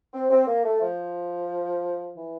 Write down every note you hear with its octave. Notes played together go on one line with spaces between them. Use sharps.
C4
C4
A#3
A3
F3
E3